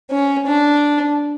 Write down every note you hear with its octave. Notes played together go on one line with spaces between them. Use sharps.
C#4
D4